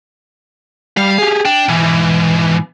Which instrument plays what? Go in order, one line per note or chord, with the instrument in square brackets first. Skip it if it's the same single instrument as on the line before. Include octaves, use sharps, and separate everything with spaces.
[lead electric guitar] G3 [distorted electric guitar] F5
[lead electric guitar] G4 G#4
[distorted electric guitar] D4 [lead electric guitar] G5
[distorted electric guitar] G#2 B2 [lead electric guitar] E3